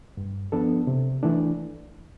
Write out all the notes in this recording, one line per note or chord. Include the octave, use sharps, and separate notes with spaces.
G2
F3 B3 D4 A4
C3
E3 A3 D4